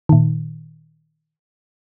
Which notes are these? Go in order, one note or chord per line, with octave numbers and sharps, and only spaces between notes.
A#2 D#3